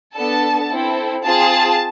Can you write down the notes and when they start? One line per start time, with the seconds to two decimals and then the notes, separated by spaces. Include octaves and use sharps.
0.15 B3 D4 A4 A5
0.71 C4 E4 A4
1.25 C4 F4 G#4 A5